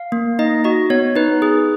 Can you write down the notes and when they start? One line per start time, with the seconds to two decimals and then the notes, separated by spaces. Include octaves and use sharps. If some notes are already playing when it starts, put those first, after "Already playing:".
Already playing: F5
0.12 A#3
0.39 D#4 D#5
0.64 F#4 D#5
0.90 B3 C#5
1.16 D#4 B4
1.42 G#4